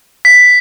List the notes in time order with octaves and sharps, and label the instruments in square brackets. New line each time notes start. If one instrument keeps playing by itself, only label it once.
[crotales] B6